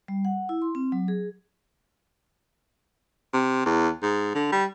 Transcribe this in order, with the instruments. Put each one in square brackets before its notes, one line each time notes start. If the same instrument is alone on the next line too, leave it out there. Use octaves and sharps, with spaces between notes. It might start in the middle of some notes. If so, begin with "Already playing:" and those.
[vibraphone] G3
F#5
E4
C6
C4
F#3
G#4
[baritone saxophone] C3
E2
G#2
D3
G3